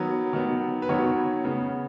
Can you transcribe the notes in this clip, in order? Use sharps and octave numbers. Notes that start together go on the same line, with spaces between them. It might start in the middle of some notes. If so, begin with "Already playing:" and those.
Already playing: D#3 F#3 B3
D#3 F#3 B3
B4
D#3 F#3 B3 C#5
C#3 B3